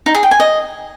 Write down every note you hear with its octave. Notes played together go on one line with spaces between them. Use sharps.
D#4
G#4
G5
G#5
D#5